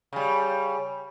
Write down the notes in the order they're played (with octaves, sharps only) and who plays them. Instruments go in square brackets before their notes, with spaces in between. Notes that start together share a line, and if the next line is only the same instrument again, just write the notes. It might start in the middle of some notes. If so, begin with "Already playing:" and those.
[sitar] C#3 G3